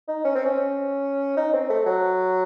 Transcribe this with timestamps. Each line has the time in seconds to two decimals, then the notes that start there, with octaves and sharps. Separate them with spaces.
0.09 D#4
0.24 C#4
0.35 C4
0.46 C#4
1.37 D#4
1.54 C4
1.70 A3
1.86 F#3